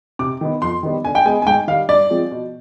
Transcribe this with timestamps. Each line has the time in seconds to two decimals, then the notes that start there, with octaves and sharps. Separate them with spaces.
0.19 C3 D6
0.41 D#3 B3
0.62 F2 C6
0.83 D#3 G3 B3
1.05 D3 G#5
1.15 G5
1.25 G#3 B3 G#5
1.42 G#5
1.47 G#2 G5
1.67 D#3 G3 F5
1.89 G2 D5
2.10 F3 G#3 C4
2.31 B2